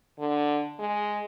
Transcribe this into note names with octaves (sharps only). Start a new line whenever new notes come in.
D3
G#3